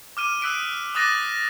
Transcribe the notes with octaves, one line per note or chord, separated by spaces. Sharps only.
D6 F6 D#7
D#6 E6 F#6 B6 D7 D#7
D6 D#6 F#6 A6 A#6 D#7